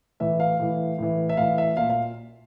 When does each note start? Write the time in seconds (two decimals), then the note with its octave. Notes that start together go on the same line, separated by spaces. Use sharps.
0.20 A2 E3 E5
0.40 F5
0.59 A2 E3
0.98 A2 E3
1.29 E5
1.37 A2 E3 F5
1.58 E5
1.77 A#2 F5
1.90 F5